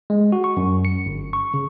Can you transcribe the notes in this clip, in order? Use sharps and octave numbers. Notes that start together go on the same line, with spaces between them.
G#3
F#4
C#6
F#2
C#7
G1
C#6
C#3